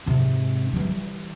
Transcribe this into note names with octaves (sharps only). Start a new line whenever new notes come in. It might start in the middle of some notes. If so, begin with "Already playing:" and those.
G#2 C3
E3 G3